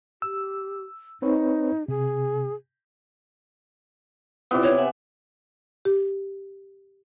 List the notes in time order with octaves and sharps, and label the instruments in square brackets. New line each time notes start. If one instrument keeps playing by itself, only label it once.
[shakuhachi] G4 [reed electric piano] E6
[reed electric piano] C4 B4 C#5 [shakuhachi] D#4
[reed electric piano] C3 [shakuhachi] G#4
[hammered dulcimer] C3 B3 [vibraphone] E4 F4 D5
[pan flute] C#5
[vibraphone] E5 F#5 G#5
[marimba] G4